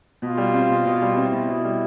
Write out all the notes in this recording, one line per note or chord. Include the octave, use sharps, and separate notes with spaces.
B2 F4
G3
C4
B2
B2
G3
C4 E4
B2
B2
G3